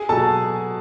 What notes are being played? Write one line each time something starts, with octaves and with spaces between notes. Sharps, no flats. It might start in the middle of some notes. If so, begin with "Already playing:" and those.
Already playing: G#4 G#5
B2 F#3 A4 A5